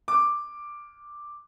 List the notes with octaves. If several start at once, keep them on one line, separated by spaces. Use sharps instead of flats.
D6